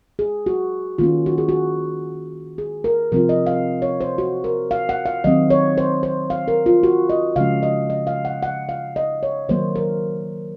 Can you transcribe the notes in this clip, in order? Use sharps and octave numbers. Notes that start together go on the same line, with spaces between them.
G#4
F#4
D#3 A#3 C#4 F4
F#4
G#4
F#4
G#4
A#4
C3 F3 C4 F4 A#4
D#5
F5
C#5
C5
F#4
A#4
F5
F#5
F5
D#3 F#3 C4 D#5
C#5
C5
C5
F5
A#4
F4
F#4
D#5
C#3 F3 G#3 C#4 F5
D#5
D#5
F5
F#5
F#5
F5
D#5
C#5
D#3 F#3 A#3 C5
A#4